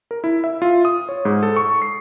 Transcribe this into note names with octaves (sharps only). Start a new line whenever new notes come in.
A#4
E4
E5
F4
D#6
C#5
G#2
A4
C#6
C7